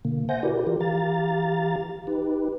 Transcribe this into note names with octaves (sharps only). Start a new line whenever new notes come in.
B2 D3 A#3
C5 E5 F#5 G#5 G6 A#6
E4 F#4 G4 A#4 B4 D5
E3 F4 G4 A#4
E3 G4 F5 A#5 A6
D#4 G4 B4